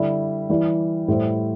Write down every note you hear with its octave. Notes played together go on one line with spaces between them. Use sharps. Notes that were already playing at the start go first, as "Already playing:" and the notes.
Already playing: D3 G3 E4 G4
E3 G3 E4 G4
A2 G3 E4 C5